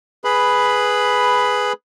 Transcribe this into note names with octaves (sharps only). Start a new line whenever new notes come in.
G#4 B4 B5